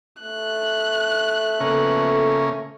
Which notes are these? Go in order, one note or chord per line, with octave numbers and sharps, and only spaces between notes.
A3 F#6
C#3 F3 A#3 B3 C#4 A4